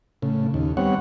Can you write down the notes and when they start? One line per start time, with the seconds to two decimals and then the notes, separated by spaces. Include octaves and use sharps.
0.22 A2 C#3
0.54 D#2
0.77 G3 B3 C4 C#5 F#5